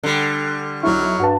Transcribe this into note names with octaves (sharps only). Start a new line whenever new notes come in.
D3 G3
B1 F#3 E4 C#6 F6
G2 F#4 A5